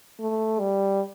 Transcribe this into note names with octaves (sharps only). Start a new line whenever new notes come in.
A3
G3